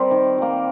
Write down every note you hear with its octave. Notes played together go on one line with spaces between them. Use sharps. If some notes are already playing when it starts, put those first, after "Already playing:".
Already playing: G3 C4 A#4 C5
D#3
G3 A#3